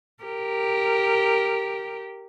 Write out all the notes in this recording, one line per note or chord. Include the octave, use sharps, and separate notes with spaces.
G4 A#4